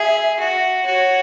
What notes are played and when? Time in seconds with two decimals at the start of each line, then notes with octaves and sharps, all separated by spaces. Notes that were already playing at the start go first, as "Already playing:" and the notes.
Already playing: G#4 E5
0.39 F#4
0.86 F#4 C#5